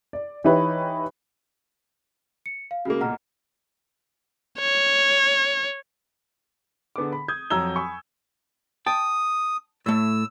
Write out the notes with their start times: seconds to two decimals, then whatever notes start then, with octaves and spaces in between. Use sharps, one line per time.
0.13 D5
0.44 E3 D#4 E4 G4 B4 C#5
2.46 C#7
2.71 F5
2.85 C#3 G#3 A#3 F#4
3.01 B1 A#2 F#5 A#5 F6
4.60 C#5
6.96 D3 B3 G#4 D6
7.12 B5
7.28 D#6 G6 G#6
7.50 F2 F#3 A#5 E6 G#6 G7
7.76 G#5 B5 C#6
8.87 G5 A5 D#6
9.86 A2 A3 E6